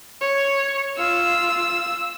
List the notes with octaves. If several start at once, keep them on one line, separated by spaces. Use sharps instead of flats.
C#5
F4 E6